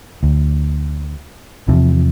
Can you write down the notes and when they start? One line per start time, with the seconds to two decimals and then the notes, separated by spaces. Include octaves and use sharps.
0.23 D2
1.68 E2 C3 F3